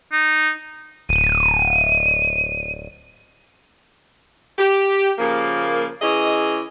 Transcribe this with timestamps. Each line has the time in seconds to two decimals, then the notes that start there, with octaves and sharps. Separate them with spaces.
0.12 D#4
1.09 D1 D#7
4.59 G4
5.18 C#3 F3 A#3
6.02 E3 C#4 G#4 D#5